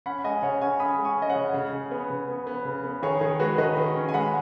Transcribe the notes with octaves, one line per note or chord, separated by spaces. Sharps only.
C#4 F#5 B5
G#3 D#5 G#5
C#3 C#5 F#5
C#4 G#5 C#6
C#4 B5 D#6
G#3
G#5 C#6
C#4 D#5
C#5 F#5
C#3
C#3
C#3
B3
C#3
B3
B3
C#3
B3
D#3 G#4 C#5
D#3 G#4
G#3 F#4 B4
D#3 B4 D#5
D#3
C#4
G#5
G#3 F#5 B5